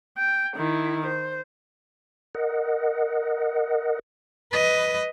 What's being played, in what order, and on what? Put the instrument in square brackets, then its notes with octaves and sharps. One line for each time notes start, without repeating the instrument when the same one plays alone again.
[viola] G5
D#3 E4
C5
[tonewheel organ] A#4 D#5 F#5
[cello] B4 D#5